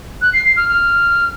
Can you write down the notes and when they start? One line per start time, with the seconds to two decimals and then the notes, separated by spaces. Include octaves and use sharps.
0.22 F#6
0.33 C7
0.45 C7
0.57 F6
0.68 F6